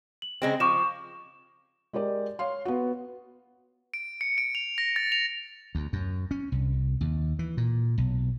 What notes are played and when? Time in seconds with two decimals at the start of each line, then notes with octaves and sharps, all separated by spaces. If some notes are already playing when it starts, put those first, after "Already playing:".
0.22 F#7
0.42 C#3 G#3 C4
0.60 F3 C#6 D6 E7
1.93 G#3 G4 A#4 D5
2.39 C#5 F5 C6
2.65 B3 F#4
3.94 D7
4.21 C#7
4.38 D7
4.55 F7
4.78 A#6
4.96 A6
5.12 F7
5.75 D2
5.93 F#2
6.31 C#4
6.52 C2
7.01 D#2
7.39 E3
7.57 A#2
7.98 B1